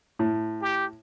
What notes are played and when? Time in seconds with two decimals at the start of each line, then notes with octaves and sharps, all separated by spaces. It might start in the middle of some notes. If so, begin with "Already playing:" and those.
0.19 A2
0.62 G4